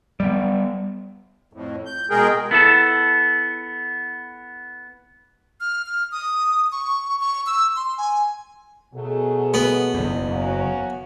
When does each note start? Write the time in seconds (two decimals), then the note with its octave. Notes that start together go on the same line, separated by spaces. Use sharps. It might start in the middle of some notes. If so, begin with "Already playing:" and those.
0.20 G3 G#3 B3
1.53 F2 A2
1.86 G6
2.10 B2 G#3 G#4 A#4 G5
2.51 B3 E4 A4 A5
5.61 F6
5.86 F6
6.12 D#6
6.72 C#6
7.21 C#6
7.46 E6
7.76 C6
7.98 G#5
8.94 B2 F#3 A3 G#4
9.54 B3
9.94 F#1 E2
10.26 A#3 C#4 F#4